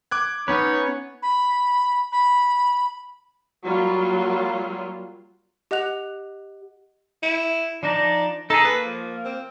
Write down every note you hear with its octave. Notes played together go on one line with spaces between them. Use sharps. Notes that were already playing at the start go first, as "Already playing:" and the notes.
D6 F#6 G#6
B3 C#4 D#4 B4 C#5
B5
B5
F#3 G3 A#3 F4
G4 D#5 F#5 F#6 F7
E4
F3 D4 D#4 D5
D#4 G#4 A4
A#3 B4
F3
C4